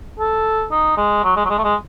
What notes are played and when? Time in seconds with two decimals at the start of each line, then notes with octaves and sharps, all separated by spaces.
0.19 A4
0.71 D#4
0.97 G#3
1.24 F#3
1.36 G#3
1.45 F#3
1.50 G#3
1.58 A3
1.64 G#3